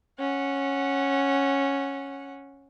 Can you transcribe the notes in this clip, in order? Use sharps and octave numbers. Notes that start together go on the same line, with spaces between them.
C#4 F#5